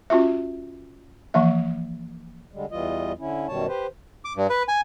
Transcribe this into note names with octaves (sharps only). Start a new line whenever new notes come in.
C#4 F4 F#4 E5
E3 F3 A#3 E5
D3 G3 G#3
E2 E3 G3 F4 D#5
D3 C#4 E4
F#2 B2 D#3 G3 C#5 A5
G4 B4 C5
D6
G2
B4
G#5